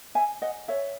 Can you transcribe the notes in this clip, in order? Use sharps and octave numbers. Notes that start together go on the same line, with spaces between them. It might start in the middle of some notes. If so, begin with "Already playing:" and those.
E5 G#5
D#5 F#5
C#5 E5